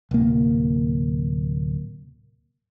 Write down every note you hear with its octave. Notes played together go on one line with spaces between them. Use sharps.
D1 C3 A#3